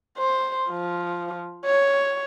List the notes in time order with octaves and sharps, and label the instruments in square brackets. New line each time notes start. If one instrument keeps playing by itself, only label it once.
[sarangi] C5
F3
C#5